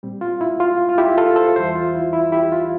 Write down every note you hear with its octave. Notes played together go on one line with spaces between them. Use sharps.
A#2 G3 C4
F4
E4
F4
F4
E4 G4
F4 A4
A4 C5
E2 E3 G3 C5 E5
F4
E4
E4
E4 G4
F4